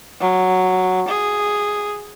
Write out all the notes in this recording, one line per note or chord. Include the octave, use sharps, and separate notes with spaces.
F#3
G#4